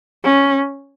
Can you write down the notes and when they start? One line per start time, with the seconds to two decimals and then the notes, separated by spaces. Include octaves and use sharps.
0.24 C#4